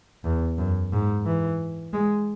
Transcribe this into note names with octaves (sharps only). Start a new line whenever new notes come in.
E2
F#2
G#2
E3
G#3